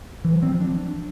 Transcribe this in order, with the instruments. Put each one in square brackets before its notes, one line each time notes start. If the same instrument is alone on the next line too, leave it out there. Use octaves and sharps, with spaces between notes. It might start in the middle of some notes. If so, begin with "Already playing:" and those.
[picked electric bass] E3
F#3
C4
F3
D4